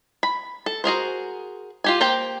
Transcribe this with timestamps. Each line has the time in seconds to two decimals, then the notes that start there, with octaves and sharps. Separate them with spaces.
0.23 B5
0.66 A4
0.84 F#4 G#4 A#4 C5
1.84 F4 G4 G#5
2.01 A#3 G4 A#4 C5 G5